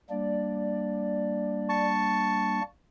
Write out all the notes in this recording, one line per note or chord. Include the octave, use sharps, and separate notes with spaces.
G3 A#3 D4 D5
A5 C#6